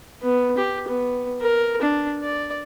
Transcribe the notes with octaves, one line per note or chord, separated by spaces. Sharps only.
B3
G4
B3
A#4
D4
D5